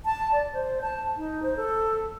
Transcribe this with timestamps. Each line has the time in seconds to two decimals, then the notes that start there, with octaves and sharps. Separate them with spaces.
0.05 A5
0.32 D5
0.53 C5
0.82 A5
1.17 D#4
1.42 C5
1.57 A4